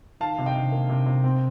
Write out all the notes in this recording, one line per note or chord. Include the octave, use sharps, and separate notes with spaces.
D#3 F5 A5
C3
D#5 G5
C3
A#3
C3
C3
C4